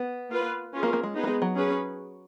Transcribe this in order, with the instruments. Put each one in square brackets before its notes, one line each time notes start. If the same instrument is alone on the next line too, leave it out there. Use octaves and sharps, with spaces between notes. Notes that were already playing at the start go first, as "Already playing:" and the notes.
Already playing: [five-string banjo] B3
[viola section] A#3 F4 B4
C#4 F4 G#4
[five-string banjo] A#3
A#3
G#3
[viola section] B3 D#4 G#4 B4
[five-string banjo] A#3
G#3
F#3
[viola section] C#4 G#4 B4